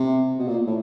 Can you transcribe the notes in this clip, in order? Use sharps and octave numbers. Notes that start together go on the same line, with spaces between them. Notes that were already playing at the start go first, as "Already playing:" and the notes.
Already playing: C3
B2
A#2
A2